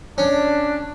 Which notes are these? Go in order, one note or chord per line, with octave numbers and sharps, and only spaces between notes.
C#4 D4